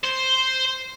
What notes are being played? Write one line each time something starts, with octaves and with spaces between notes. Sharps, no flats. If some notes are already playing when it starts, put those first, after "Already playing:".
C5